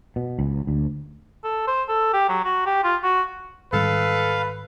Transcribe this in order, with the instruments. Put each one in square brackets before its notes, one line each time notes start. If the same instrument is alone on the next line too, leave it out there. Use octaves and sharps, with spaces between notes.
[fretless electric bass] B2
C#2
D2
[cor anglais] A4
C5
A4
G4
F#3
F#4
G4
F4
F#4
[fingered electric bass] G#2 D#3 G3 [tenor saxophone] A4 [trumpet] B4 [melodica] F5